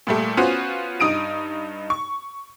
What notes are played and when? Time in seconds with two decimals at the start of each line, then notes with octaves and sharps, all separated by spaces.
0.07 A#2 G3 A3
0.37 B3 C#4 F4 F#4 C5
1.00 G2 D#4 D#6 D7 D#7
1.90 C#6